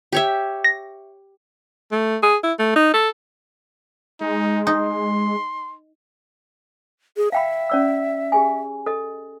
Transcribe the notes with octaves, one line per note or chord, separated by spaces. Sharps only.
G4 C#5 E5
A#6
A3
G#4
E4
A3
D#4
A4
G#3 D#4
D#4 C6
G#4
E5 F5 G5 B5
C#4 D5 E6
G4 G#4 G#5
A4 D#5